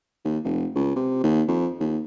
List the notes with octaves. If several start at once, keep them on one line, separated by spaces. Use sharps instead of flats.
D#2
F1
C#2
C3
D#2
F2
D#2